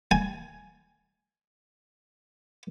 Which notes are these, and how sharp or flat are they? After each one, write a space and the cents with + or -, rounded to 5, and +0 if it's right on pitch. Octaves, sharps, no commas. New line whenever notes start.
G#5 +10